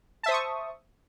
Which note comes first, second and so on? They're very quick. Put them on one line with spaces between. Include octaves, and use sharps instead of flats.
A5 E5 C5 D#6 C#6